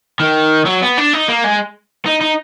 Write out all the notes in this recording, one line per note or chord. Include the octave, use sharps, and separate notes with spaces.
D#3
F#3
B3
D4
D#4
A#3
G#3
D#4
D#4